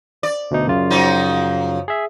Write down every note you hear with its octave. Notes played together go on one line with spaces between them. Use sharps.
D5
D2 B2 D#4
F#2 C#3 F4
F3 F#3 D#4
G#4 E5